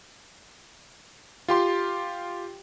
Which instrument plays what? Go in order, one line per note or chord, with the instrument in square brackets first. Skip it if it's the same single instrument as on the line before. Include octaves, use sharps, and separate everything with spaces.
[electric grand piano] F4 G4 C6